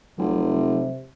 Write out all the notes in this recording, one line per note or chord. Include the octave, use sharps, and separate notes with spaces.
F1 C3 F3 F#3